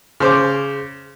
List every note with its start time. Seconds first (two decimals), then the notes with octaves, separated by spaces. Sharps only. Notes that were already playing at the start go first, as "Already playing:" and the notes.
0.20 C#3 C5 D6